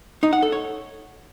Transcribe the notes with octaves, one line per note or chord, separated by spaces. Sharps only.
D#4
F#5
A4
C#5